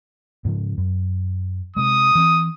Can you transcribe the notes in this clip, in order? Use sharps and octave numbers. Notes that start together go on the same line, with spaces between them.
G#2 C#3 F3
F#2
C3 G#3 D#6
E3 C4